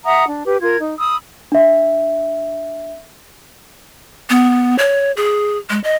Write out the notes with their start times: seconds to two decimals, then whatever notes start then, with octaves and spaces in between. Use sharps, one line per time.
0.05 E5 F#5 A#5 D#6
0.28 D4
0.46 G4 B4
0.62 F4 A#4 G#6
0.79 D#4
0.99 B5 D#6 E6
1.52 D4 E5
4.30 B3
4.79 C#5
5.17 G#4
5.70 G#3
5.84 D#5